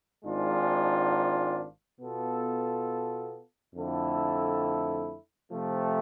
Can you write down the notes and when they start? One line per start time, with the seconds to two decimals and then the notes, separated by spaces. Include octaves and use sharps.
0.24 G#1 G#2 G#3 D4 F4
2.00 B2 B3 F4 A4
3.75 F2 D3 A3 E4 A4
5.51 C3 F3 A3